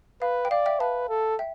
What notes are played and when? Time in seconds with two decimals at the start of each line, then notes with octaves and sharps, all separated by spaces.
0.22 B4 F5
0.45 G5
0.51 D5 F5
0.66 E5 G5
0.80 B4 F5 A5
1.09 A4
1.39 E5 G5